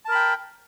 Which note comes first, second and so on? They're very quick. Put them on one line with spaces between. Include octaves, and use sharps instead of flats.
A5 A#4 B5 G5